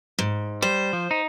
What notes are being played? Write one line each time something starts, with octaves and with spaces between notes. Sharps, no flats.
G#2
G3 C5
F3
D#4